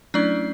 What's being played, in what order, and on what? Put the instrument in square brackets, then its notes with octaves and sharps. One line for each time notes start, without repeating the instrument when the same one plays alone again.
[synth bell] F#3 A3 C#4 D4 E4 D5